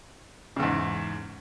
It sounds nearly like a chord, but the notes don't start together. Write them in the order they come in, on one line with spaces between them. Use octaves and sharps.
C#3 E2 G#2